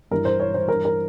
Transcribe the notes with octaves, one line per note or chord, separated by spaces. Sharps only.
G2 E3 A#4
C5
C#5
C5
G2 E3 A#4
A#4